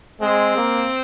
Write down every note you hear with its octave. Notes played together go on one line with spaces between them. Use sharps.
G#3 C4
A#3